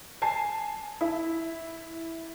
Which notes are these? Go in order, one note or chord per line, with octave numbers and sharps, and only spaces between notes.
G#5 A5 C7
E4